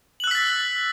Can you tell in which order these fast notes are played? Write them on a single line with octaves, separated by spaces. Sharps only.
F#7 F#6 E6 B6 A6